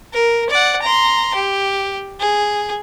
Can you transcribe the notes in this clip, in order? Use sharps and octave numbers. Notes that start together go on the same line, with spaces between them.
A#4
D5 F#5
A#5 C6
G4
G#4